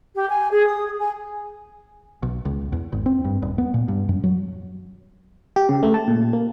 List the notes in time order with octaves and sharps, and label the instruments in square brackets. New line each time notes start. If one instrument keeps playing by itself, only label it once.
[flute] G4
G#5
G#4
D#6
G#5
[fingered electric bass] B1
C#2
E2
G#1
C4
G2
D#1
B3
A#2
G2
F#2
F#3
[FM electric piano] G4
C#3
A3
A5
A#2
A#3